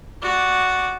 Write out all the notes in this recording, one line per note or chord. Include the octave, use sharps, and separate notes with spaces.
F#4 D5